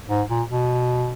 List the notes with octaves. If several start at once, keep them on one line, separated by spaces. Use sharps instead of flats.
G#2
A#2
B2